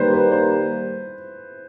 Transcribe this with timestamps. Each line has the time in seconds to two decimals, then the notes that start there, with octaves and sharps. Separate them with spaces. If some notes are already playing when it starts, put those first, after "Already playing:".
Already playing: D#3 G3 A#3 B4 C5
0.13 B4
0.32 C5